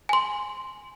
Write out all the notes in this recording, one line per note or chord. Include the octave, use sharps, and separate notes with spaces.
G#5 C6